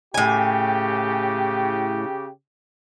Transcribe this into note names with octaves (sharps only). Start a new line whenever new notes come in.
A2 C#3 G4 G#5